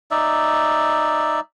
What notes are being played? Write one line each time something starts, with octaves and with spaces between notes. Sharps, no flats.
D#4 D5 E5